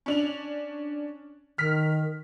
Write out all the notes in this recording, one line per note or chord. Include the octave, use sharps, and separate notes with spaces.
C#4 D4 F7
D#3 F6 B6